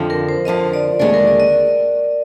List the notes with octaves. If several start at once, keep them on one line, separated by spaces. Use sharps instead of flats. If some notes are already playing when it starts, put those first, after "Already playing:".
Already playing: F2 D3 F3
A#4
C5
F2 D3 F3 D#5
D5
D#2 D3 G#3 D4 D5
A#4
D5
D#5